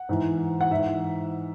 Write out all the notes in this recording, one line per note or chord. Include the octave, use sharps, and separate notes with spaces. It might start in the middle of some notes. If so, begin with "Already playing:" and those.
Already playing: F#5
G#2 E3
F#5
G#2 E3 E5